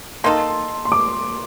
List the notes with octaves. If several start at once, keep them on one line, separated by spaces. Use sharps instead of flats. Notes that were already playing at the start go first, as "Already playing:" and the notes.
A#3 D#4 A4 C6
C6
D6